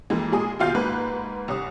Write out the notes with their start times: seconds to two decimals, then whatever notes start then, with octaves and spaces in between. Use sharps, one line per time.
0.10 F2 E3 G#3 A#3
0.32 A#2 G#3 G#4 D#6
0.59 D#2 B2 F4 F5 G6
0.74 G#2 A#3 B4 F#6
1.48 C2 C#4 D#6